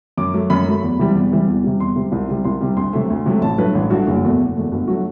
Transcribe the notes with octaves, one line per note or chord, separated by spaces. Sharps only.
F#2 D6
F#3 A3
F#2 B5
F#3 A3
E2
C3 E3 G3
E2
C3 E3 G3
E2
C3 G3
E2 C6
C3 G3
C2
C3 G3
C2 C6
C3 G3
D2 C6
C3 F#3 A3
D2
C3 F#3 A3
A1 A5
G2 F#3 A3 B4
A1
G2 F#3 A3 F#4
F#1 F#4
E2 B2 A3
F#1
E2 B2 A3
G1 F#4
F#3 A3 F#4